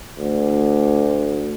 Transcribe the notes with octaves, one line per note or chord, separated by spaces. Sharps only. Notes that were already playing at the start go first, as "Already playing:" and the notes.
D2